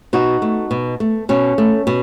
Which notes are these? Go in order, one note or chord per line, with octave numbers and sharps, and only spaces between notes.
B2 D#4 F#4
A3
B2
A3
B2 C#4
A3
B2